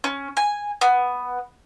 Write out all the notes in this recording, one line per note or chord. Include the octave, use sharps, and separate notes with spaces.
C#4
G#5
B3